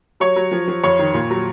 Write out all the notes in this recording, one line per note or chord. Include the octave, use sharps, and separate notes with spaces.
F#3 C#5
F#3
F3
F3
F2 C#5
D#3
A#2
F#3